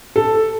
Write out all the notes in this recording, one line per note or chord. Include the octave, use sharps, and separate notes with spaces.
A4